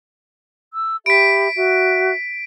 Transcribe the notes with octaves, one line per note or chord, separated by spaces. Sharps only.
E6
G4 E5 B5 B6 D7
F#4 E5